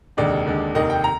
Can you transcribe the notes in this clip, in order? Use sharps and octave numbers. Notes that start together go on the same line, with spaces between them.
F1 D#2 D3 G#3 D5
D#2 D3 G#3
F1 D#2 D#3 A#3 D#5
G5
A#5